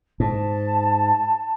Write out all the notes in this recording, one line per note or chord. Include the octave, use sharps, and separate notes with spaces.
G#2 A5